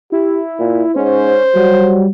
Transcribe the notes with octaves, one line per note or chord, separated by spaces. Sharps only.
E4 G4
A#2
G#2 C#4 C5
F#3 G3